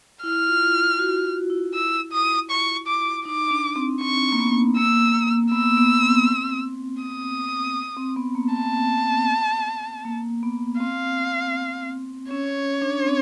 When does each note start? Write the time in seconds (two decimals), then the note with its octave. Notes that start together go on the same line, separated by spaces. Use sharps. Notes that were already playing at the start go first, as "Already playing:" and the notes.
0.23 E4 F6
0.48 F4
0.99 F#4
1.24 F4
1.50 E4
1.74 E6
2.12 D#6
2.50 C#6
2.87 D6
3.25 D#4 D6
3.51 D4
3.76 C4
4.01 C4 C#6
4.32 A#3
4.39 B3
4.77 A#3 E6
5.14 A#3
5.52 B3 E6
5.77 B3
6.03 C4
7.03 D#6
7.97 C4
8.16 B3
8.35 A#3
8.54 A5
10.05 A#3
10.43 B3
10.80 C4 F5
12.31 C#4 C#5
12.82 D4
13.07 C4